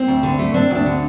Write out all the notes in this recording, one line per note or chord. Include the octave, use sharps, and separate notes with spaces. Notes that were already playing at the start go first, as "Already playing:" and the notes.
Already playing: C4
D2
D3
A3
C4 D4
D2
D4
D3